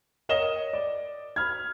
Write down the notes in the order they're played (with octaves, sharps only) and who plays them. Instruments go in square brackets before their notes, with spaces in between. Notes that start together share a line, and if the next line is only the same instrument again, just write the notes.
[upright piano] A#4 C#5 D#5 E7 G7
D5
B5 F6 G#6